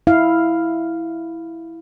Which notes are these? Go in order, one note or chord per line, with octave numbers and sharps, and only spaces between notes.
E4 F5